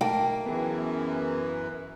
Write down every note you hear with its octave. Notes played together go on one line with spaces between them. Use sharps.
B1 A3 A#3 D#4 G5 A5
F#2 E3 B3 G#4